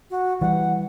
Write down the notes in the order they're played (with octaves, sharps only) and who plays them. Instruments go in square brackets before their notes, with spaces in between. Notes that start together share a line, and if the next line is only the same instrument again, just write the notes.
[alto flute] F#4
[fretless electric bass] E3 G3 [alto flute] F#5